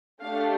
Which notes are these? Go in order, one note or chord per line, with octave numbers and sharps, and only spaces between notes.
A3 D4 G4 F5